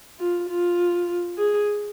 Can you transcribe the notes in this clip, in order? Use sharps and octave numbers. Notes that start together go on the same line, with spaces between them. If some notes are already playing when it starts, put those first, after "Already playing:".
F4
F4
G#4